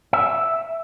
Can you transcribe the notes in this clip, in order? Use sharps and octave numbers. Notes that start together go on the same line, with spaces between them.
E5